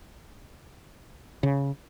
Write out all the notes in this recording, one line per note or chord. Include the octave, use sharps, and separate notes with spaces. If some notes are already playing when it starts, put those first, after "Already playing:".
C#3